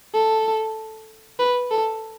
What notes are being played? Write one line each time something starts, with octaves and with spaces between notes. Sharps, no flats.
A4
B4
A4